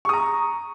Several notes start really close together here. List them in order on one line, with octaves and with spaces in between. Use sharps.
C#6 D#6 A#5